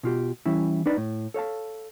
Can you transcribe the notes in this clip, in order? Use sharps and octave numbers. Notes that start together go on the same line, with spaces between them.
B2 F4 G4
E3 G3 C#4 E4
D4 D#4 B4 D5
A2
A4 C#5 F5 A5